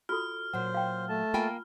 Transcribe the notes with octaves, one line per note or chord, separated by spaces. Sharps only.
F4 F#4 A4 F6
A#2 F#3 C5 F#5
F5 G5
A3 A5
A#3 F4 G5 G#5